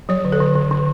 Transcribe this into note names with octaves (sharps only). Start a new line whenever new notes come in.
F#3 C#5
D3
A4
D3
D3
D3